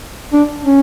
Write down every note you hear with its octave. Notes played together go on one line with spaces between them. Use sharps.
D4
C#4